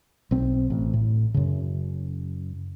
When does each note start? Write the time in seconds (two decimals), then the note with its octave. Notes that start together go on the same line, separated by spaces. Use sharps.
0.31 B1 C4
0.70 A1
0.93 A2
1.34 F#2 C#3